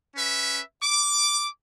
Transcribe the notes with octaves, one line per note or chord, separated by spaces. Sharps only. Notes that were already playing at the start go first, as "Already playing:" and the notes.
C#4 B4 E5
D6